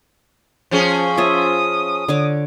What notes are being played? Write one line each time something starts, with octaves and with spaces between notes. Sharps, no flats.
F3 C#4 G#4
F4 C#5 E5 D#6
D3 C#5 D6